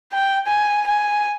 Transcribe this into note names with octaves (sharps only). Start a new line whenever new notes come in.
G5
G#5
G#5